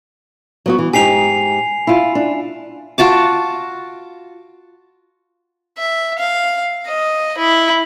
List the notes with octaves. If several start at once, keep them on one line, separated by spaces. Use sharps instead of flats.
F#3 B3 F#4
E3
G#2 D#4 G4 G#5 C7 F7
E4 F4
D4
F4 F#4 A5 D6
E5
F5
D#5
E4